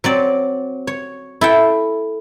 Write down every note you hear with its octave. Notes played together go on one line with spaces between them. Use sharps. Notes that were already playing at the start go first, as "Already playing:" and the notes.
F#3 C4 D5
C#5
E4 A4 G5